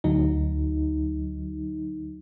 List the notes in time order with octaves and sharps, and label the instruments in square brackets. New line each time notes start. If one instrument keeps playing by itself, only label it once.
[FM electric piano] D2 F#3 D#4